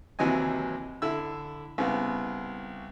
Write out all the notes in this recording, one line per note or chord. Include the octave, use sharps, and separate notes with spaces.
D#2 C3 E3 F#3 D#5 G#5
D3 E4 E6
C2 C#3 B3